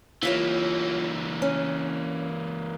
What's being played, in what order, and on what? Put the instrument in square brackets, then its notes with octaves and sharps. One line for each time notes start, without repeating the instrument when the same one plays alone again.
[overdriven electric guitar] E3 A#3 [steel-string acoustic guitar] E4 F4 C#5
[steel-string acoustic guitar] C#4